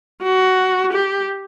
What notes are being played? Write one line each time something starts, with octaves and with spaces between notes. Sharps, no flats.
F#4
G4